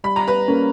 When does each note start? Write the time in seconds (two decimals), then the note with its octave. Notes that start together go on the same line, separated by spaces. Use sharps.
0.04 G3 B5
0.16 A#5
0.28 B4 B5
0.48 A#3 C#4